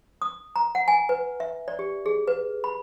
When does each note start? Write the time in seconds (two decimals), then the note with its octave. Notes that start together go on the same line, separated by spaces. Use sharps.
0.22 D#6
0.56 A#5
0.75 F#5
0.88 G#5
1.09 B4
1.40 E5
1.68 D5
1.79 G4
2.06 G#4
2.28 B4
2.64 B5